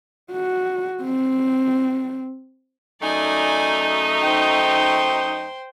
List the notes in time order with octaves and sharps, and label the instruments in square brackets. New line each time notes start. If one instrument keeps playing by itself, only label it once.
[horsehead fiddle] F#4
C4
[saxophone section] F#2 A3 D#4 [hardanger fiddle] D5 G#5
[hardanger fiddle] C5 G5